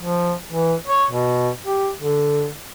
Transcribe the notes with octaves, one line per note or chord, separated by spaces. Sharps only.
F3
E3
C#5
B2
G4
D3